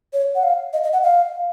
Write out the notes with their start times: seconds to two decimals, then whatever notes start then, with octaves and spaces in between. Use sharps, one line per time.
0.13 C#5
0.35 F#5
0.43 F5
0.73 D#5
0.83 D#5
0.93 F#5
1.03 F5